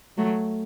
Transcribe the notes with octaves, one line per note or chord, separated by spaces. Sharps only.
F#3 A3